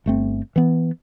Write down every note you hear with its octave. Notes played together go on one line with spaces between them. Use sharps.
G1 A3 C4
E3 B3